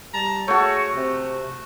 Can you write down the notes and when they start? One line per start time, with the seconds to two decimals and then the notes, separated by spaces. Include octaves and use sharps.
0.14 G3 A5 A#5
0.48 A3 F#4 G#4 C#5
0.96 C3